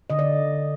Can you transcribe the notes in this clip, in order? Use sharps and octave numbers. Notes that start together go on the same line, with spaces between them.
D3 D#5
D5